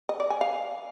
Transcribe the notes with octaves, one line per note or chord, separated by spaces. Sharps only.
D#5
D5
G#5
F5